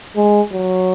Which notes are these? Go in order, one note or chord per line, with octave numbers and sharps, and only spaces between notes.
G#3
F#3